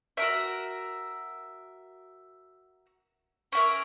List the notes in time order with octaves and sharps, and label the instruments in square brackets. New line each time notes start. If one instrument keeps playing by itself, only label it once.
[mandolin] F#4 A#4 E5
C#4 E4 A#4